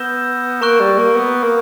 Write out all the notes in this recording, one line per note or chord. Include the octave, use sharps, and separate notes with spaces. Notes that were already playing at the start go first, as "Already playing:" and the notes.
Already playing: B3 E6 G6 A#6 E7 G7
A#3 A#5 C#6 F#6
G3
A#3
B3
A#3